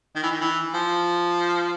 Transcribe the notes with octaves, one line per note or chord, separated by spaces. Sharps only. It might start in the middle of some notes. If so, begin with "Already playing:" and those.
D#3
E3
D#3
E3
F3